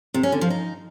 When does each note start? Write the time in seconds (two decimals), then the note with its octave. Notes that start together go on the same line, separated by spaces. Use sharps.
0.14 C3
0.23 C#4
0.32 D3
0.41 F3
0.50 D#4